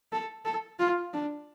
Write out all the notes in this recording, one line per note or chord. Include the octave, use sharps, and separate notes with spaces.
A4
A4
F4
D4